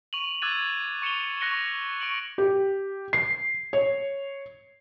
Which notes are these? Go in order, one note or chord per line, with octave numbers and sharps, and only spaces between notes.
C#6 D#7 F7 F#7
D6 E6 F#6 G#6 A6 D#7
C#6 C#7 E7 F7 G7
C#6 F#6 A#6 C#7 G7
C#6 D7 F#7
G4
C7
C#5